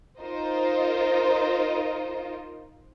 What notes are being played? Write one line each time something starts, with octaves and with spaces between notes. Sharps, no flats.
D#4 F4 A#4 C5 D#5